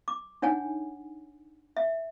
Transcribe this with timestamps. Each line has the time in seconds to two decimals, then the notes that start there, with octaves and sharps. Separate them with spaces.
0.08 D6
0.42 D4 D#4 C#5 F#5 G#5
1.77 E5